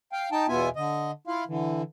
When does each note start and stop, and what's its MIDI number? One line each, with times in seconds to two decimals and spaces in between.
0.12 0.29 77
0.12 0.29 79
0.32 0.46 63
0.32 0.46 79
0.32 0.46 81
0.48 0.69 40
0.48 0.69 47
0.48 0.69 59
0.48 0.69 65
0.48 0.69 76
0.48 0.69 80
0.76 1.11 50
0.76 1.11 75
1.27 1.44 64
1.27 1.44 65
1.27 1.44 77
1.48 1.82 50
1.48 1.82 52